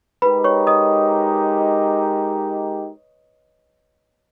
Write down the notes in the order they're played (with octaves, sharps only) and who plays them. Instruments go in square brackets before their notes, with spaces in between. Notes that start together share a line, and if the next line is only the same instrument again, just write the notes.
[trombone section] G#3 D#4 G4 A#4 [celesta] B4 B5
[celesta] C#5 C#6
D#5 D#6